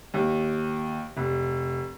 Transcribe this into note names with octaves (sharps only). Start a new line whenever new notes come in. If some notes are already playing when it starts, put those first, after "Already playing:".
D#2
F1